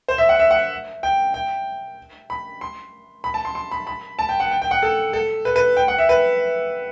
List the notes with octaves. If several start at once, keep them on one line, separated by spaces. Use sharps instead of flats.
C5
E5
F#5
E5
F#5
G5
G5
B5
C6
B5
A5
C6
C6
B5
B5
A5
G5
F#5
G5
G5
F#5
A4
A4
B4
B4
G5
F#5
E5
B4